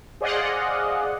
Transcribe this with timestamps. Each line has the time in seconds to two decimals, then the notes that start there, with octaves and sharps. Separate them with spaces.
0.21 G#4 C5 D5 D#5 F5 F#5